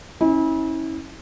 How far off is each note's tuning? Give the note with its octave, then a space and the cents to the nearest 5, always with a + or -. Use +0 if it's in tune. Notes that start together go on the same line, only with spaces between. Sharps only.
C#4 -15 E4 -35